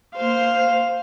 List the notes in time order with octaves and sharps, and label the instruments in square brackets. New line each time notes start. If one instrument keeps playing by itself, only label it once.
[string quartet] A#3 C5 C6 [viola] F5